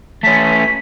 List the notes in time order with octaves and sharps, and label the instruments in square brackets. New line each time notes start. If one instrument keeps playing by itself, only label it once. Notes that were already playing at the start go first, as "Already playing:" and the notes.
[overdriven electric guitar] A3 C#4 [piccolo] B6